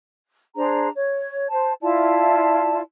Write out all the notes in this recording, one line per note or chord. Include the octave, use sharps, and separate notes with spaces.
D4 G#4 C5 A#5
C#5
C5 A5
E4 F4 D5 A5